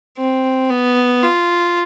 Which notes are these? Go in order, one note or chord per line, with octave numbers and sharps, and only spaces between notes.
C4
B3
F4